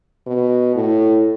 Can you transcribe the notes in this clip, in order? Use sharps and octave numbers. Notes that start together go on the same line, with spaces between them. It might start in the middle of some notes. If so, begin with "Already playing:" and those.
B2
A2